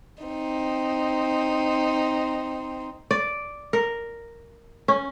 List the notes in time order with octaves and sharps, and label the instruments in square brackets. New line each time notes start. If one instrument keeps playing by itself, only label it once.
[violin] C4 D#4
[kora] D5
A#4
C#4